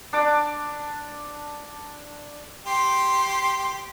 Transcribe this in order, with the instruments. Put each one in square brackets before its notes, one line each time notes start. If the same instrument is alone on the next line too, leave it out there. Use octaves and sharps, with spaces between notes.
[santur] D4 D6
[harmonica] G4 [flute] C6